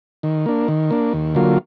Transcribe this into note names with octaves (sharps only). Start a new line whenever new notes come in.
D#3
A#3 D4
D#3
A#3 D4
D#2
D3 F#3 A#3 F4